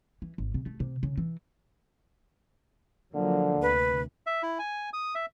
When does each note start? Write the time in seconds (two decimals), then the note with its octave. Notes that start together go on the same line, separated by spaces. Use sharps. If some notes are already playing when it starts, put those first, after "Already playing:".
0.22 E3
0.38 G#1
0.54 C3
0.66 A3
0.80 C3
1.03 C#3
1.17 E3
3.15 D3 F3 F#3 A#3
3.62 D2 C3 B4
4.26 E5
4.43 E4
4.59 G#5
4.93 D#6
5.15 E5